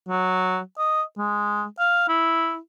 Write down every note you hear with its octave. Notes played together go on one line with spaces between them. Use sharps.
F#3
D#5
G#3
F5
E4